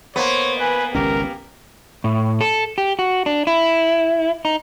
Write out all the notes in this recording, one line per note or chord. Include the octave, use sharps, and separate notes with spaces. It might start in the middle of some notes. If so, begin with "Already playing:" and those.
A#3 B3 C5 C#5
B4 G#5
G#1 C#2 C#4 G4 A#4
A2
A4
G4
F#4
D4
E4
D#4